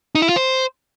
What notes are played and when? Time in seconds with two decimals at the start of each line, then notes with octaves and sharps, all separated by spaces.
0.15 D#4
0.22 E4
0.29 F4
0.36 C5